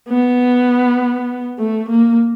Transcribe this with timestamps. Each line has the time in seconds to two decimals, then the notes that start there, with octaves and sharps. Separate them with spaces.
0.09 B3
1.59 A3
1.89 A#3